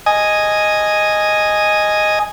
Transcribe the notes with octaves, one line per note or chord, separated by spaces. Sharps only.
D#5 G#5